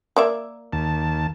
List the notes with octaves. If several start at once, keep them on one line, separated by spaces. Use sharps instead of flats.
A#3 D5 E5
D#2 A5